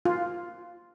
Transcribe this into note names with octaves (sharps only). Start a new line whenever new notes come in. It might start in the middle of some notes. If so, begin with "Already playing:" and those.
F4